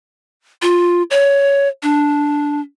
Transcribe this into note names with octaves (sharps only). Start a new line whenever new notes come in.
F4
C#5
D4